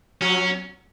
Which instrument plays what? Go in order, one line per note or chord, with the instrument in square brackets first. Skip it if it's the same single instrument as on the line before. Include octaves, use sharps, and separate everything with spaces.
[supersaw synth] F#3 [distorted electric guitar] C#4